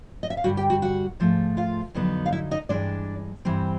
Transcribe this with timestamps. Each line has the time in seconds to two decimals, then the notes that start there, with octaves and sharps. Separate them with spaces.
0.23 D#5
0.30 E5
0.37 F5
0.44 G2 D3 G3 F#4 F#5
0.57 G4 G5
0.70 F#4 F#5
0.82 F#4 F#5
1.20 G#2 F3 A3
1.57 F4 F5
1.94 F2 D3 F#3 B3 D#4
2.26 F5
2.32 E4 E5
2.51 D#4 D#5
2.69 G2 E3 G#3 D4 D5
3.45 G2 E3 G3 C4